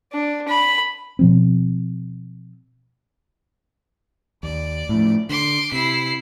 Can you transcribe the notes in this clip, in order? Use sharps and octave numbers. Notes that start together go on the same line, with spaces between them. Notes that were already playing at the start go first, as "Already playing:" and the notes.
D4
B5
B2 F3 C4
D#2 D5
A2 F3
D3 C6 D6
C3 E4 C7